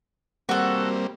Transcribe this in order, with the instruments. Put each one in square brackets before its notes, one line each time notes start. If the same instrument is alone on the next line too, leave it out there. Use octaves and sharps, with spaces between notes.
[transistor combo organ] G3 A#3 C4 [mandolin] F#4 A4